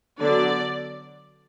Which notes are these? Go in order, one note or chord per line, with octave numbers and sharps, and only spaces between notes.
D3 F#3 B3 D4 D5